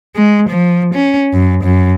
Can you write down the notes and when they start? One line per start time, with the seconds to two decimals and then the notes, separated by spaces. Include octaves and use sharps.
0.16 G#3
0.49 F3
0.94 C#4
1.33 F#2
1.63 F#2